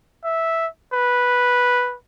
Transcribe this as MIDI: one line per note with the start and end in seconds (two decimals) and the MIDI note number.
0.24 0.67 76
0.93 1.95 71